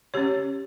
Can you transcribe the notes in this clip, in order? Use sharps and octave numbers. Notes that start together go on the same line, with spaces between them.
C#4 G4 C#5